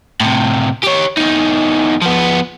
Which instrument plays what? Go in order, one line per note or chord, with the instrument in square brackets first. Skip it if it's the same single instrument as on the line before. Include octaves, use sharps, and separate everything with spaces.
[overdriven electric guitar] A2 C3
G4 C#5
E2 D#4
F3 B3